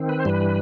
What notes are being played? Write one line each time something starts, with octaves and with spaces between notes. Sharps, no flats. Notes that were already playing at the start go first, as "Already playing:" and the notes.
Already playing: D#3 C4
B4
C5
G2 E3 G3 B4